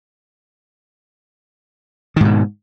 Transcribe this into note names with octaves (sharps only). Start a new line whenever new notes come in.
G#2 B2 D#3